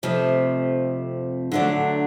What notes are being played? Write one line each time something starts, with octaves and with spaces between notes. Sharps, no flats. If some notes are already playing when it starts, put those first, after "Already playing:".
F2 C3 F3 A3
D3 F#3 A3 D4